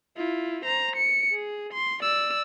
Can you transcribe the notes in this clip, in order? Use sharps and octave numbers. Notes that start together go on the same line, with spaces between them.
E4 F4
C5 A#5
C#7
G#4
C6
D5 E6